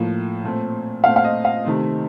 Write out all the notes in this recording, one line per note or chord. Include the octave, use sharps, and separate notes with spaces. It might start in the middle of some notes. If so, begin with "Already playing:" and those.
Already playing: A2 F3 A#3
A#2 A3 C4
A#2 A3 C4 F5
F5
D#5
F5
C3 D#3 A3 C4